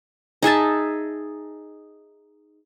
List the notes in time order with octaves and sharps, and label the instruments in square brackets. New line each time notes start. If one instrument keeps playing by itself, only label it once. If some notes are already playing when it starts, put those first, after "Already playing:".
[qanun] D#4 G#4 E5 A5